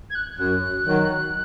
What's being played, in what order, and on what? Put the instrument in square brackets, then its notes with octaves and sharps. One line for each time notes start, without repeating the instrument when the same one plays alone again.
[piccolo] G#6
F#6
[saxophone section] F#2 [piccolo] F#6
[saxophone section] D#3 F#3